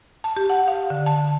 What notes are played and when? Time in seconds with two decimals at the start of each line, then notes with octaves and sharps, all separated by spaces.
0.24 A5
0.37 G4
0.50 F#5
0.68 F5
0.90 D3
1.06 A5